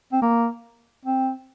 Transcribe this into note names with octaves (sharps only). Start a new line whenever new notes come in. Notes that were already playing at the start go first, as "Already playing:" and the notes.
C4
A#3
C4